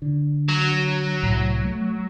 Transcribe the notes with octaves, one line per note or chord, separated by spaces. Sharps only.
D3
F#3
C2 A2
A3